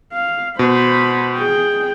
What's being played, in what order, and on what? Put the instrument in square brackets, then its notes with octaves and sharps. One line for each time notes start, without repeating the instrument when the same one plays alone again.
[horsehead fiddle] F5
[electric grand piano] B2 [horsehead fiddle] C5 B5
[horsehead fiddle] G#4 G5